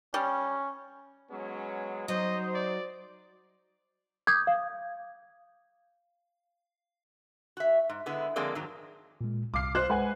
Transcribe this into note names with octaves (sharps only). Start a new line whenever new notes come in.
G3 C#4
F#3 G#3 B3 C#4
F#3 D#4 C5 D#5
D5
D6 D#6 G6 G#6
F5
F#4 E5
G#2
D3 G#3 B3 E4
D3 F3 G#3 A#3 C4 D5
F2 G#2 D#3 F#3
A#2 G#3
C2 F5 D6 F6 C7
C5 F#6
G#3 B4 F#5 G#5